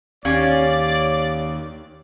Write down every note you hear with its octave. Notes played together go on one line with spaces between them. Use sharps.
D#2 C#4 G4 C#5 D5 F5